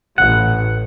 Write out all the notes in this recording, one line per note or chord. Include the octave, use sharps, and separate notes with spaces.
A1 F#5